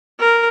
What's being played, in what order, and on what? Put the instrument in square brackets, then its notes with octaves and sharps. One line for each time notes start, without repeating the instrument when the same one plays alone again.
[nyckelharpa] A#4